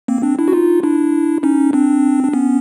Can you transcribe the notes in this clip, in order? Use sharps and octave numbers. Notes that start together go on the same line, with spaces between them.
A#3 C4
C4 D4
D4 E4
F#4
D#4 F4
D4 E4
C#4 D#4
C4 D4
D4
B3 C#4